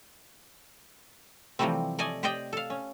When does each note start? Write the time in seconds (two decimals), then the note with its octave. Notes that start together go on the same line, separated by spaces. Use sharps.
1.59 C3 E3 F3 G3 A3 C4
1.99 A3 D5 D#5 G#5
2.23 G4 C5 D5 D#5 G5
2.53 A4 F5
2.70 C#4